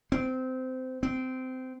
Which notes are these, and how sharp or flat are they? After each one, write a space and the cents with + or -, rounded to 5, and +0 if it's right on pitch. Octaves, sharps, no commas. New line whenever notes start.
C4 -20
C4 -20